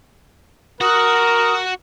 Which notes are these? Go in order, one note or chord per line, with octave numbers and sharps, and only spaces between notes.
F#4 A#4 F#5 D#6